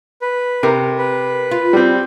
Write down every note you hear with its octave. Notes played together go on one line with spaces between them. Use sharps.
B4
C3 A#4
B4
F4
G3 C4